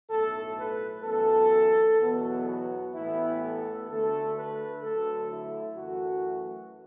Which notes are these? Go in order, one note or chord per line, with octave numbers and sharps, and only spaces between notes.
B1 A2 A3 A4
B4
F#2 E3 B3 A4
E2 B2 F#3 B3
F#4
A1 A2 E3 B3 E4
A4
D2 D3 A3 A4
B4
D2 D3 F#3 A3 A4
E4
F#2 E3 A3 F#4